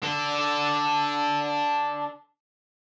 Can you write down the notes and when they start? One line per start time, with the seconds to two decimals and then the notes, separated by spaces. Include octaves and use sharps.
0.03 D4 A4